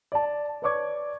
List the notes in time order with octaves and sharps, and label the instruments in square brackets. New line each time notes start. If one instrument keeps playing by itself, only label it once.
[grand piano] D5 A5
B4 C#5 D5 C#6 D6 G#6